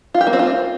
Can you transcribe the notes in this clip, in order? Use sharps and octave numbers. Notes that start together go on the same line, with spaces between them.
F4
G4
A#3
C4
F4